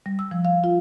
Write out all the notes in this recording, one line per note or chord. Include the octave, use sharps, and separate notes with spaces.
G3
E6
F3
F5
F4